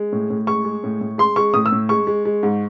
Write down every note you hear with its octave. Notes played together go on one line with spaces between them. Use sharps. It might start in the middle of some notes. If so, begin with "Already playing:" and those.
Already playing: G#3
A2
A2
G#3 C#6
G#3
A2
A2
G#3 C6
G#3 C#6
A2 D#6
E6
A2
G#3 C#6
G#3
G#3
G#2